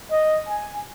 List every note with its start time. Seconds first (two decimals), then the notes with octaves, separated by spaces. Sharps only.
0.11 D#5
0.48 G#5